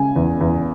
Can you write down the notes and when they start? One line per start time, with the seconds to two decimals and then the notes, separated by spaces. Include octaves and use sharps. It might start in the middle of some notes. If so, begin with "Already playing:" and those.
Already playing: C#3 G#3 G#5
0.16 E2
0.41 E2